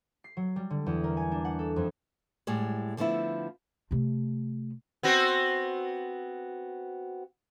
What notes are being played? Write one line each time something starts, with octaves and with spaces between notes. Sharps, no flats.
C7
F#3
G3
D3
E2
A#4
G#5
D4
F#5
A4
F2
A2 G3 G#3
D3 F3 A3 B3 E4
C3 A3
B3 C4 F#4